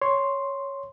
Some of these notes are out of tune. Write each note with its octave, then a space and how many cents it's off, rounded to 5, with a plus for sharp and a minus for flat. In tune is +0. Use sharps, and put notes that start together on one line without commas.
C#5 +0 C6 +0